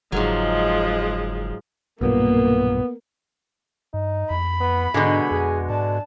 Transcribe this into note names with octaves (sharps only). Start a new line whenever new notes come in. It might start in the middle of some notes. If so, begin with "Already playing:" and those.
F#1 G#2 F3 F#3 G#3
B1 G2 A#2 A#3 B3
G2 D#4
F2 B5
B3
G#2 B2 D3 G#3 D#4
F2 G#4
G#2 D4 A5